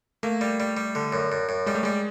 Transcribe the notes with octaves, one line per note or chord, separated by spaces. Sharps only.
A3 A#3
G3
G3
G3
D3
F#2
F#2
F#2
G3 G#3
A3
G3 G#3